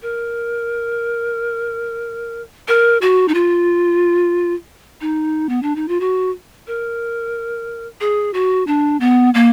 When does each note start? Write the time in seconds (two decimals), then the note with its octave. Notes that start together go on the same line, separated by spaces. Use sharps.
0.02 A#4
2.68 A#4
3.02 F#4
3.28 D#4
3.34 F4
5.01 D#4
5.49 B3
5.63 D4
5.76 D#4
5.88 F4
6.00 F#4
6.67 A#4
8.01 G#4
8.34 F#4
8.67 D4
9.00 B3
9.34 A#3